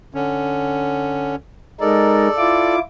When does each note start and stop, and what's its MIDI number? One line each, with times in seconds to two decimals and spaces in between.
0.14 1.36 50
0.14 1.36 61
1.81 2.28 56
1.81 2.28 63
1.81 2.76 69
1.81 2.28 70
1.81 2.76 74
2.38 2.79 64
2.38 2.79 65
2.38 2.79 86